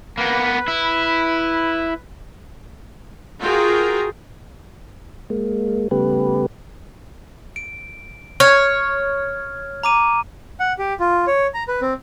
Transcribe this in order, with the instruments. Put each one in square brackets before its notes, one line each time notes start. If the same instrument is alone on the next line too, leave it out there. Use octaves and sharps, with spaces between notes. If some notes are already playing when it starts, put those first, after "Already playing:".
[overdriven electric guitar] A#3 B3 [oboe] B4
[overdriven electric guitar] E4
[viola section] F4 F#4 G#4 A#4 G5
[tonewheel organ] G#3 A#3
C#3 G3 A3 B3 G4 B4
[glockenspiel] D7
[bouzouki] C#5 [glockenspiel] F6 G#6
[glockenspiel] A#5 D6 D#7
[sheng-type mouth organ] F#5
G4
F4
C#5
A#5
B4
C4